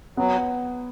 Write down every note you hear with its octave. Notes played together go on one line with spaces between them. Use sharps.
F#3 B3